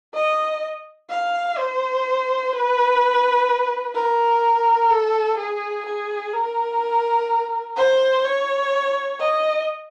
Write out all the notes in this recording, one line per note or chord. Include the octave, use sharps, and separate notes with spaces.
D#5
F5
C5
B4
A#4
A4
G#4
G#4
A#4
C5
C#5
D#5